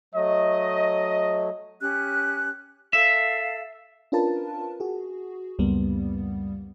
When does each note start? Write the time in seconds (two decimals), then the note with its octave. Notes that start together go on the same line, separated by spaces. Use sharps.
0.15 F#3 A3 D#5
1.81 C#4 G4 F#6
2.93 A4 E5 F5
4.12 C#4 D4 F4 A#4 B4 A5
4.80 F#4 G#4
5.59 C#2 F#2 G3 A#3 B3